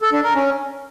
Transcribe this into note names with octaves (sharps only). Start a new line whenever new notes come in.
A4
D4
A#4
C#4